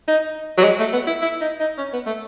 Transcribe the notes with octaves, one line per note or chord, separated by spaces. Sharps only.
D#4
F#3
G#3
A3
B3
E4
E4
D#4
D#4
C#4
B3
A3